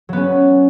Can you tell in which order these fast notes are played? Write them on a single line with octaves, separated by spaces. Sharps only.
F#3 B3 C#4